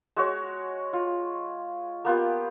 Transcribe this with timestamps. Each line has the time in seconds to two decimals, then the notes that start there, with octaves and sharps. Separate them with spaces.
0.17 G#3 F#4 C#5
0.93 F4
2.05 A#3 B3 F4 G4